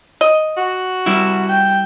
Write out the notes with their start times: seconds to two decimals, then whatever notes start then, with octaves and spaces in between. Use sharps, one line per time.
0.21 D#5
0.57 F#4
1.06 G3 E4
1.49 G5